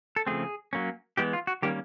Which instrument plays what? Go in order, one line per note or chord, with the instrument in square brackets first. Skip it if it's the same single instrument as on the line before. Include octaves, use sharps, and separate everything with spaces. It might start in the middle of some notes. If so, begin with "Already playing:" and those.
[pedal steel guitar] A4
C#3 F3 A3 C4 G#4
F#3 A#3 C#4
E3 G#3 B3 G4
F4
F#4
D#3 G3 A#3 C#4 G4